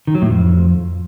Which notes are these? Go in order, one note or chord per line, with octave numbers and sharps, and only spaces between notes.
D#3
F#3
A2
F2